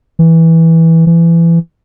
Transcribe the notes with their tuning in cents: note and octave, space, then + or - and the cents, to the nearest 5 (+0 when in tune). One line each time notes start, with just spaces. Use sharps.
E3 -10
E3 +25